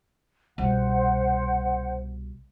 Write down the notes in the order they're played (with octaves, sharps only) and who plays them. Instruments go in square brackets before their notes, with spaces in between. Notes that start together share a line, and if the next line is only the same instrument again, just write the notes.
[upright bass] C2 B2 [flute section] C5 F#5